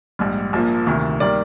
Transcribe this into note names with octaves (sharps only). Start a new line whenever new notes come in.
A#1 G#2 G3
A#1 A#2 F3 A#3
D2 C3 D#3
D#3 G3 A#3 D5